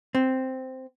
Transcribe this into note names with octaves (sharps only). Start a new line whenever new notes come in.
C4